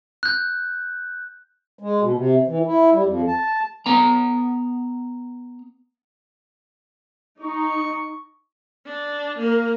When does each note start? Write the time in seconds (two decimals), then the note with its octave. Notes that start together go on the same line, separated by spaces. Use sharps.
0.23 F#6 G6
1.79 G#3
2.01 B2
2.16 C3
2.48 E3
2.66 E4
2.93 G3
3.06 F2
3.28 A5
3.86 B3 A#5
7.40 D#4 C#6
8.86 D4
9.39 A#3 A#4